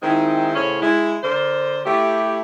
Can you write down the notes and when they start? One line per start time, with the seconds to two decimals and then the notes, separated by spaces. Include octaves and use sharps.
0.03 D#3 G#3 C4 D#4 E4
0.55 A2 C#3 C#4 C5 C#5
0.81 G#3 E4
1.23 D3 A#4 C5
1.85 A3 E4 G4